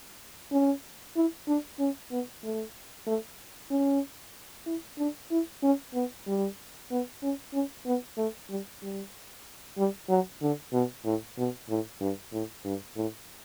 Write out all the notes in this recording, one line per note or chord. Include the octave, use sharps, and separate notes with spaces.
C#4
E4
D4
C#4
B3
A3
A3
C#4
E4
D4
E4
C#4
B3
G3
B3
C#4
C#4
B3
A3
G3
G3
G3
F#3
D3
B2
A2
B2
A2
G2
A2
G2
A2